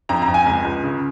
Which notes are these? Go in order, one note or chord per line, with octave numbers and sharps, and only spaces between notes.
F2 A#5
A#5
F2
G#5
C#2
C#2
C#3